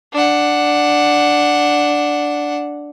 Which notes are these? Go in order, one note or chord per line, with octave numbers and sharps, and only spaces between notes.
D4 F#5